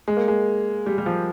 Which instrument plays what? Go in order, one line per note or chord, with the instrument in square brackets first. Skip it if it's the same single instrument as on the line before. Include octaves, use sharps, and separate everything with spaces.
[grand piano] G#3
A#3
G#3
G3
G3
F3